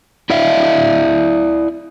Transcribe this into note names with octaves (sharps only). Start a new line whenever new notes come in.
E4 D5 E5 F5